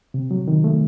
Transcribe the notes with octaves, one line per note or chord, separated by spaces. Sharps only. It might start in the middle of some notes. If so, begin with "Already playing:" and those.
C3
F#3
D#3
A3